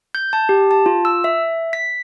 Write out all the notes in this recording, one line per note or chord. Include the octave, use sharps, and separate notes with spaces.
G6
A5
G4
A5
F4
E6
E5
B6